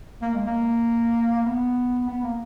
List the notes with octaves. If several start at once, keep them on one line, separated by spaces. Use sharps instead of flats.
A#3
G#3
A#3
B3
B3
A#3